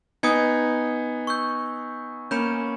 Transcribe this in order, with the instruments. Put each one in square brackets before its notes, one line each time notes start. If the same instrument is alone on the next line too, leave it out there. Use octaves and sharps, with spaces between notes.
[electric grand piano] B3 D#4 [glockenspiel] G#5 D#6 G#6 C#7
[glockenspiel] C#6 E6 G6
[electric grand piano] A#3 C#4 [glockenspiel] B5 G6 C#7 E7